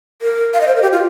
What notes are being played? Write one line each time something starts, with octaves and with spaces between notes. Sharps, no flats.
A#4
F5
D#5
C5
A#4
G4
F4